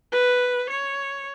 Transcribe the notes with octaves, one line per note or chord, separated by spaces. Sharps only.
B4
C#5